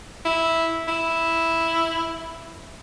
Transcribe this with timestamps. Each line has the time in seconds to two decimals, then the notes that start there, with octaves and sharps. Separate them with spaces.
0.25 E4
0.88 E4